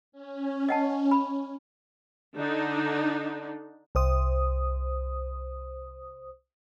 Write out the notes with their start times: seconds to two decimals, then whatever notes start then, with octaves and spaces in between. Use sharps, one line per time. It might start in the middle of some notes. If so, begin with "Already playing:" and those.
0.12 C#4
0.69 D#5 F#5 A5
1.11 B5
2.36 D3 D4 D#4
3.95 C2 C5 D#6